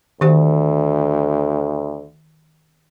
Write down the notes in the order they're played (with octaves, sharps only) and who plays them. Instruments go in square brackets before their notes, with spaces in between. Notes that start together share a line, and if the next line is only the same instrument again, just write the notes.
[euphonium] D2 [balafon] D#3 G4 C5